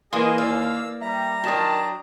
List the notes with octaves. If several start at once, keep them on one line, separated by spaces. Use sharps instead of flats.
E3 A#3 G#4 D#5 F5 G#5 C6
D#2 A#3 D5 F5 E6
G3 E5 A#5
D#3 F#3 D4 F#4 G5 A5 D#6